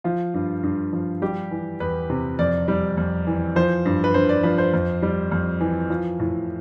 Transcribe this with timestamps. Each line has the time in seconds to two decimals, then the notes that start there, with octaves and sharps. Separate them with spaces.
0.04 F3 F4
0.34 G2
0.63 G2
0.93 F3
1.22 G3 G4
1.51 E3
1.80 E2 B4
2.10 C3
2.39 F2 D5
2.68 G3
2.97 F2
3.27 E3
3.56 F3 C5
3.85 G2
4.04 B4
4.14 G2 C5
4.29 D5
4.43 F3 B4
4.58 C5
4.73 F2
5.02 G3
5.31 F2
5.60 E3
5.90 F3
6.20 A2